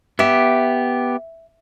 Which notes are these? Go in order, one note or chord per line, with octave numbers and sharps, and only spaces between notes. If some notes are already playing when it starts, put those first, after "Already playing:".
B3 G4 E5